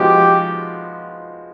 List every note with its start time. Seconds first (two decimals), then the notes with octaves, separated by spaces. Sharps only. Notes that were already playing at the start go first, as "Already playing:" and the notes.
Already playing: F3 G#3 B3 D#4 F#4 G4